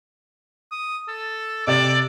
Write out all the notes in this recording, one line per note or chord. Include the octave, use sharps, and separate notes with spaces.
D#6
A4
C3 A4 D5